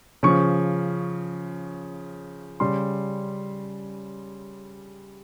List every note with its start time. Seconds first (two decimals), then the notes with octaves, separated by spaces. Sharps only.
0.23 C#3 F3 C#6
2.60 C#3 G3 C6